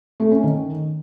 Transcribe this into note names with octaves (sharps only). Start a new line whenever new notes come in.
A3
C#4
D#3